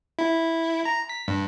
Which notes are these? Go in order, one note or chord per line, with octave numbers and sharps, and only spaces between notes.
E4
A#5
B6
G2